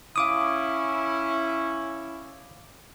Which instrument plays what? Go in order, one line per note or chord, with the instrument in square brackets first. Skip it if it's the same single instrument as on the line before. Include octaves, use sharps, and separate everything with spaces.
[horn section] C#4 E4 [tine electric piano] F5 D6 D#6